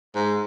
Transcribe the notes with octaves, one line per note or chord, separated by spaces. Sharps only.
G#2